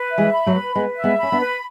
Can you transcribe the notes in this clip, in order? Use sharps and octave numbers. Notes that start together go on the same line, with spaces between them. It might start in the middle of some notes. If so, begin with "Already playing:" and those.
Already playing: B4
E5
E3 G#3
B5
F#3 A3
B4
G#3 B3 B4
E5
G#3 B3
B5
C#4
B3 D4
B4